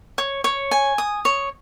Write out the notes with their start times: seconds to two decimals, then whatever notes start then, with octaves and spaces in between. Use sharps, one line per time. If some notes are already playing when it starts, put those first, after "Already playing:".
0.18 C#5
0.44 C#5
0.71 G#5
0.98 D#6
1.25 C#5